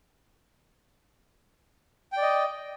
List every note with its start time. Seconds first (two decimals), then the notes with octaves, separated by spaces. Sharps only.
2.12 G5
2.17 D5
2.22 D#5